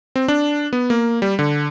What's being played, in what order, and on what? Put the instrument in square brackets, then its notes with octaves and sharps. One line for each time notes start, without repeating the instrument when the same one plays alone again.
[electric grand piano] C4
D4
B3
A#3
G3
D3